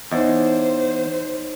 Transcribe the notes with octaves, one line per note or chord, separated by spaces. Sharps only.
E2 D#4 C5 C#5 D#5